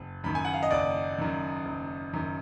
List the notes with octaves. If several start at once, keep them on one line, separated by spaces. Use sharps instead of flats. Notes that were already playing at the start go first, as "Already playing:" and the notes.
Already playing: F#1
F#2 D#3 B5
G#5
F#5
F5
D#5
F#1 D5
F#2 D#3
F#1
F#2 D#3